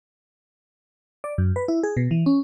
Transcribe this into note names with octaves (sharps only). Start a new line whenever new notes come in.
D5
F#2
B4
E4
G#4
B2
E3
C#4